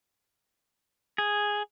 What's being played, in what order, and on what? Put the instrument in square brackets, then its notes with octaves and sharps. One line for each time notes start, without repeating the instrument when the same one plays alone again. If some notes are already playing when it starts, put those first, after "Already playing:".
[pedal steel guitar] G#4